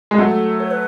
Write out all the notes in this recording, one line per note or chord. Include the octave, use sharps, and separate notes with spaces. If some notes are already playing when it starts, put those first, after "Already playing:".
G#3
F#3 A3 A4
C#5
B4